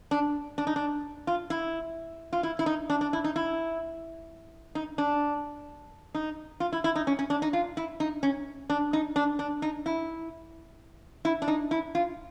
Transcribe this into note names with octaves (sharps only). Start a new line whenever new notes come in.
D4
D4
D#4
D4
F4
E4
F4
E4
E4
D#4
D4
D4
E4
D#4
E4
D#4
D4
D#4
F4
E4
E4
D#4
C#4
C#4
D4
D#4
F4
E4
D#4
C#4
D4
D#4
D4
D4
D#4
E4
E4
D4
D#4
E4
F4